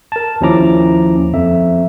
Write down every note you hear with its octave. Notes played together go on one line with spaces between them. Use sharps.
A#4 A5
D#2 F3 C#4 E4 A#5 D6
F2 E5